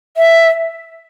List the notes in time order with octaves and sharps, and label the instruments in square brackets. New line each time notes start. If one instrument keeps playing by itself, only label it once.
[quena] E5